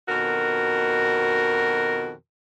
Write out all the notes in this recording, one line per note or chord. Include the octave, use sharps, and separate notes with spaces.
F2 B2 D#3 F#4 A#4